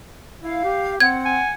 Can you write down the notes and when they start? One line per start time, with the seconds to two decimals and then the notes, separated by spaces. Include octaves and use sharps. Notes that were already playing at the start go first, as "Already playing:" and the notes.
0.43 E4 F5
0.64 G4
1.00 C4 F#5 G#6
1.25 G#5